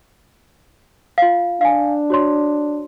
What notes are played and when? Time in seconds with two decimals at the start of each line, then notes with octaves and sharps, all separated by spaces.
1.18 F4 F5
1.61 D4 F5 G#5
2.10 F#4 C#5 C6